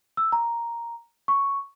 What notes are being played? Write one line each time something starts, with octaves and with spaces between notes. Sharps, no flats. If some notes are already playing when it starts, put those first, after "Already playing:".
E6
A#5
C#6